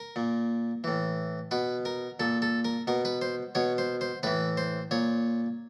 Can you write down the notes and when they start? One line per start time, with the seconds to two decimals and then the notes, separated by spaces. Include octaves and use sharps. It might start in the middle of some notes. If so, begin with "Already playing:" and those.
Already playing: A#4
0.16 A#2
0.84 A2 E3
1.51 B2 B4
1.85 A#4
2.20 A#2 A4
2.42 A4
2.65 A#4
2.87 B2 A#4
3.05 B4
3.21 C5
3.55 B2 C#5
3.78 C5
4.01 C5
4.23 A2 E3 B4
4.57 C5
4.91 A#2 C#5